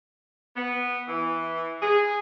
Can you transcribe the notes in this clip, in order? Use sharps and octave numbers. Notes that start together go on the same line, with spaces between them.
B3
E3
G#4